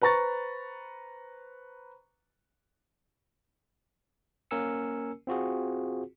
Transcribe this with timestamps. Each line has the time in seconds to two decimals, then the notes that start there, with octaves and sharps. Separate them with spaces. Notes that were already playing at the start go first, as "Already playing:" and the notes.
0.02 B4 C5 A#5 C#6 A6
4.51 A#3 C#4 A#4 G#5 E6 C#7
5.27 C4 F4 F#4 G#4